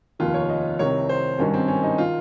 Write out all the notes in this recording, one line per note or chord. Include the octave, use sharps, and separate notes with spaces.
F1 D#2 D#3 F4
C#5
D#5
C2 C3 D#3 C#5
C5
G#1 G2 D#3 C#4
C4
C#4
D#4
D#3 F4